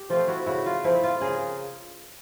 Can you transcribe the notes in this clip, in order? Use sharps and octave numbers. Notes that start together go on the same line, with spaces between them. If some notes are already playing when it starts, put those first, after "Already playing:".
Already playing: G4
F3 A3 C4 F4
E4 F#4
C#3 E4 F#4
F4
F3 A3 C4 E4
F4
C#3 G#4 A#4